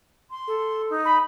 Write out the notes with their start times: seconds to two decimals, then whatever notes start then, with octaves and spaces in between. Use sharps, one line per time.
0.31 C6
0.47 A4
0.90 D#4
1.05 B5